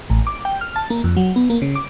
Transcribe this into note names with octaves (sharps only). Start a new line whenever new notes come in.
A1
D6
G5
F6
A5
A#3
F2
F#3
B3
A#3
C#3
D6